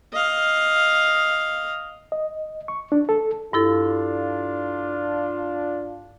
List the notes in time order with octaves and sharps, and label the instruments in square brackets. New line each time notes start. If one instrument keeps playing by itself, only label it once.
[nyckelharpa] D#5 F5
[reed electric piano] D#5
C#6
D4
A4
[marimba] G2 E4 A4 [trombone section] D4 F4